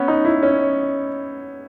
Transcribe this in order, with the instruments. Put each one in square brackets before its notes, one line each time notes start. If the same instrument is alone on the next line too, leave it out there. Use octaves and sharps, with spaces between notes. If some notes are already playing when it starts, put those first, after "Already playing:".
Already playing: [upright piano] B3 C#4
D#4
E4
C#4